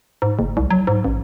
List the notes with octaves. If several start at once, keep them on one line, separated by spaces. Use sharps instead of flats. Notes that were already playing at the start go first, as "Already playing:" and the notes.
G#2
F#1
C2
F#3
G#2
A1